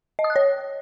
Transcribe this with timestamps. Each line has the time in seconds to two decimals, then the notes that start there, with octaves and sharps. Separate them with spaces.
0.19 D#5
0.24 D#6
0.30 F#6
0.36 C#5